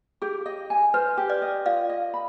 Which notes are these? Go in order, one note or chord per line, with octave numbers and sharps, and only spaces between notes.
G4 G#4
D#5
G#5
B4 C5
G4
B4 D5
D#5
F4 D5 F5
D#5
B5